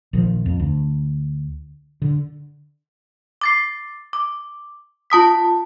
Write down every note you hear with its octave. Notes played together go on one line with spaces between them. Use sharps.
A#1 D#3 F3
F2
D2
D3
D6 A6 C7
D6
F4 A5 D#6 B6